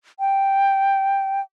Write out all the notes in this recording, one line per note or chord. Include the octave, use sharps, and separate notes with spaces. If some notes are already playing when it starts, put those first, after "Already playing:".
G5